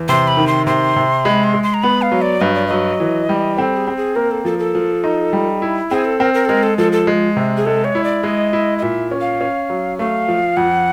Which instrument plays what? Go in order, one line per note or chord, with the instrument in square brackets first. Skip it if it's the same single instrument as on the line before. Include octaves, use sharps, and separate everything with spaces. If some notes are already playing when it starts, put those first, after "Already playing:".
Already playing: [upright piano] E2
[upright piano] C3 [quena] C6
[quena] B5
[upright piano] D#3
[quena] C6
[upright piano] C3 [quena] C6
[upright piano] C3
[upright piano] G#3 [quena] B5
[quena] C6
[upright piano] G#3
[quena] C6
A#5
[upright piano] B3 [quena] B5
[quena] F5
[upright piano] F#3
[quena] D5
[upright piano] G2 [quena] D#5
[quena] D5
[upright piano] F#3 [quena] D#5
[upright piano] E3
G3
[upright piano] C4 [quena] A4
[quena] G#4
[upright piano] C4
[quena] G#4
[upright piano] A#3 [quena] A#4
[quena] A4
[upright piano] F3 [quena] A4
[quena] A4
[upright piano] F3
D#4
G3
E4
[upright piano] C4 [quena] G#4
[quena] A4
[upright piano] C4 [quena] A#4
[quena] A#4
A4
[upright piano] G#3 [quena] A#4
[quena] A4
[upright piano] F3 [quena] A4
[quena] A4
[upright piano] G#3
C3
[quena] G#4
[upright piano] G#3 [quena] A4
[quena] C#5
[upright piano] E4
[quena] D5
[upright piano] G#3 [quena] D#5
[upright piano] E4
[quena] D#5
[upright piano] A#2 [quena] E5
[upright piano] C#4
[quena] F5
[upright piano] C#4
F#3
[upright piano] A3 [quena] F5
[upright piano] F3
[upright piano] F2 [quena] F#5